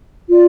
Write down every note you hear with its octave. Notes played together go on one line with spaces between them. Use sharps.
F4 D5